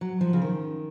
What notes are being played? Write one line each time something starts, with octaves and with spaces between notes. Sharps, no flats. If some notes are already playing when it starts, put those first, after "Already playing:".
F#3
F3
C#3
D#3